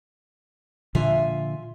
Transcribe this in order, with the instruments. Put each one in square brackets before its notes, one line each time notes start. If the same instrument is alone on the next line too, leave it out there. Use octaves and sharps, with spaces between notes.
[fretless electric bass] A#2 D3 F3 [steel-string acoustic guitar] F4 E5 G#5